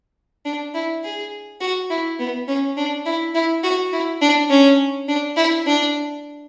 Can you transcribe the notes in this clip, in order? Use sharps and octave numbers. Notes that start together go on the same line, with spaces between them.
D4
E4
G#4
F#4
E4
B3
C#4
D4
E4
E4
F#4
E4
D4
C#4
D4
E4
D4